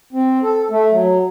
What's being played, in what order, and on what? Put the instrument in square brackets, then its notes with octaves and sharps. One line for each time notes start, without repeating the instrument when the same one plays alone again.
[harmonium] C4
A4
A3
F#3